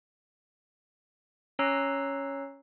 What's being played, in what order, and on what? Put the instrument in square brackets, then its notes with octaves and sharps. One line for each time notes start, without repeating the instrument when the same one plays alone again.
[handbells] C#4 C#5 A#5 E6 F#6 C7